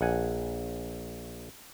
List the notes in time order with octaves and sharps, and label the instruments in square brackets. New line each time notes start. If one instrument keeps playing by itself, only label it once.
[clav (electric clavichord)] A#1 F#5 G#5